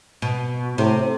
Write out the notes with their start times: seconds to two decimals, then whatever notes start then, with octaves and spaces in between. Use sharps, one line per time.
0.22 B2
0.78 A2 C3